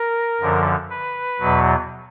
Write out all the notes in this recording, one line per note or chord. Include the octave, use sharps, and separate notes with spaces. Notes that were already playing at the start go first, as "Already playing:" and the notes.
Already playing: A#4
F#2 D3 F3
B4
E2 B2 F#3